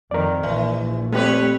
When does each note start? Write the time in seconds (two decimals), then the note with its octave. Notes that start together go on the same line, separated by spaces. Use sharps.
0.11 F2 D#3 A#4 D5
0.43 A#1 E3
1.12 G3 A3 C4 G4 B4 C#5